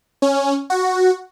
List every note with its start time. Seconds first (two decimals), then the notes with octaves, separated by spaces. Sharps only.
0.22 C#4
0.70 F#4